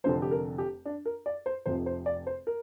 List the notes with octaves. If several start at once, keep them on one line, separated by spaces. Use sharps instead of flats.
F1 F2 D3 F3 C5
G4
A#4
G4
D4
A#4
D5
C5
F1 F2 C3 F3 C5
C5
D5
C5
A#4